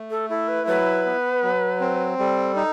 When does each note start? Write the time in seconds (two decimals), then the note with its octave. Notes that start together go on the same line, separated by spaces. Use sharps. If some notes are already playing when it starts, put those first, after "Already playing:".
Already playing: A3
0.10 A4
0.30 E4 A4
0.48 B4
0.67 F#3 B4
1.06 B3
1.43 F#3
1.80 C4
2.19 G3 A4
2.56 D#4